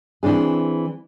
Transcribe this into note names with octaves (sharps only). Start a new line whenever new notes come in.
E3 C4 D4 G#4